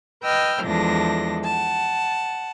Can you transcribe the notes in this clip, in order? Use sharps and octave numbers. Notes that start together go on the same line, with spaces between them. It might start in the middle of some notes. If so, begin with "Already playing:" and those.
B4 D#5 G5 E6 F6
E2 F3 G#3 D4 A4 A#6
F#5 A5